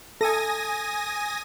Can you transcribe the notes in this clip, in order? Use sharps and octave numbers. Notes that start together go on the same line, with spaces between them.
A4 G#5 D#6 A#6